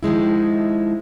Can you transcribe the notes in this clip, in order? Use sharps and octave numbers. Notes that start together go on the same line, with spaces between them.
D#3 F3 G#3 E4